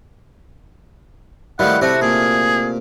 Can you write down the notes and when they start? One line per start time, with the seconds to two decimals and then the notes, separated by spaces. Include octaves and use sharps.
1.59 D#3 F3 G3 A3 E4 F#5
1.81 C3 A3 C4 F#4
2.01 A#2 G#4